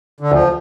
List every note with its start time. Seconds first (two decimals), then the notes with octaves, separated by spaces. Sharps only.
0.20 D3
0.32 D2 F3